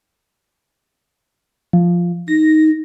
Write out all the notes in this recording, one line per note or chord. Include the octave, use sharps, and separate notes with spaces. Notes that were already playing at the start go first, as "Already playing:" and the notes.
F3
D#4 A#6